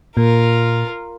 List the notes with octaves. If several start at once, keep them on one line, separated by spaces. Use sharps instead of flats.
A#2 F4 A#4